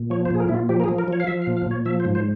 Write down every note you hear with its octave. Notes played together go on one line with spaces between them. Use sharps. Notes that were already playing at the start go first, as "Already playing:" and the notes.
Already playing: A#2
F3 C#5
C5
A#2 G#4
A#4
A#2 E4
F4
F3 G4
A#4
G#4
F3
A#4
F3 C#5
F5
F3 E5
F5
A#2
F5
A#2 C#5
F3 E5
C5
G#2
C5